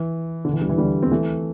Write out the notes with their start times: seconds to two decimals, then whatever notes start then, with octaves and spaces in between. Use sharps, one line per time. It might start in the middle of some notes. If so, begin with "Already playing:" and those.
Already playing: E3
0.45 D3
0.53 E3
0.61 D3 G3
0.69 E3
0.78 D3 G3
1.03 C4
1.11 E3 A3